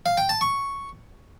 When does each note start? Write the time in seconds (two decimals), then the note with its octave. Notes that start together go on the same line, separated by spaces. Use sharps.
0.06 F5
0.18 G5
0.29 A5
0.41 C#6